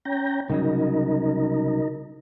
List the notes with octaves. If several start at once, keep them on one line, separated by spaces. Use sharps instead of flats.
C#4 G5 A#5
C2 C#3 F#3 D#4 A#4